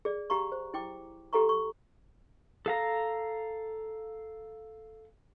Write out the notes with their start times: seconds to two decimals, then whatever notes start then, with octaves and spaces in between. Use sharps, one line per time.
0.05 G#4 D5
0.30 G4 F5 A#5 C#6
0.52 C5
0.74 E4 G5 D6
1.33 G4 A4 F5 A#5 C#6
1.49 C#6
2.66 A4 F5 A#5